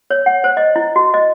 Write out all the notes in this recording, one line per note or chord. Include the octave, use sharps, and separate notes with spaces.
C#5
F#5
C5
D#5
E4
F#4
D#5